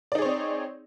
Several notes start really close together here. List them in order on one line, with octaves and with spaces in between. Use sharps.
D5 D#4 G#4 C#5 C4